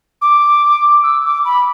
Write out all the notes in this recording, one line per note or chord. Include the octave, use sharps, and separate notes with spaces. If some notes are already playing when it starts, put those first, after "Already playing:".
D6
E6
D6
B5